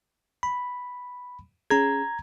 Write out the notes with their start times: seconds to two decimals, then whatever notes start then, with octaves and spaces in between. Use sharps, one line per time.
0.43 B5
1.70 C#4 G#4 A#5 G#6